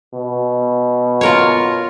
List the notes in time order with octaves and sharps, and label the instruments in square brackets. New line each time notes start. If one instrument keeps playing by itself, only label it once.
[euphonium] B2
[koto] F4 A#4 C#5